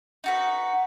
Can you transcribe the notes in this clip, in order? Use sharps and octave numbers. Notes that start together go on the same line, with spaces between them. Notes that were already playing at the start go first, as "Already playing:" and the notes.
D#4 F#4 B4